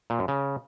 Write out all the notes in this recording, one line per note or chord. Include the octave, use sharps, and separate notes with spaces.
A#2
F#2
C#3